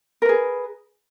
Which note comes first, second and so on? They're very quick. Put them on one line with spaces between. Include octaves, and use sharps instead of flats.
A#4 B4 G#4